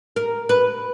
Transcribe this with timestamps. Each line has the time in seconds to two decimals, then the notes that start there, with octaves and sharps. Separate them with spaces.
0.16 A#4
0.49 B4